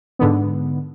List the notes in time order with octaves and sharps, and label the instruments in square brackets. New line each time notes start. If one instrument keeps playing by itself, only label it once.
[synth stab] G#2 D3 B3